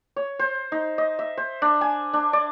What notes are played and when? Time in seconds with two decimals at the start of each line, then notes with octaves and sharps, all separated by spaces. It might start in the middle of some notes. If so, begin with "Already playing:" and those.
0.16 C#5
0.39 C5
0.72 D#4
0.98 D#5
1.19 E5
1.37 C5
1.62 D4
1.81 G#5
2.13 D4
2.33 D5